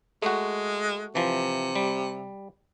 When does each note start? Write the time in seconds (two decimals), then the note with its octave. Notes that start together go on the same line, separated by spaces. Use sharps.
0.22 G#3 A3 F#4
1.15 C3 E3 F3
1.76 G3